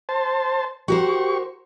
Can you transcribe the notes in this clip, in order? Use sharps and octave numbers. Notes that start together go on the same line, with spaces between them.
C5 A5
F#4 G4 A#4 C5 C#6